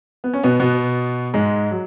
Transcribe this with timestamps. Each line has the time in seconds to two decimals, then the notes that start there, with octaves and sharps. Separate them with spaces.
0.24 B3
0.33 C#4
0.43 B2 B3
0.60 B2 B3
1.34 G#2 G#3
1.71 F#3